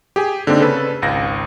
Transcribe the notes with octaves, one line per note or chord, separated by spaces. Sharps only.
G4 G#4 G#5
D3 A#3 C4 D4 D#4
C#3 A4 B4
G#1 C#2 A#6